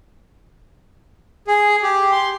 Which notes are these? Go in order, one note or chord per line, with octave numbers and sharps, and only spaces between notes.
G#4
G4
C6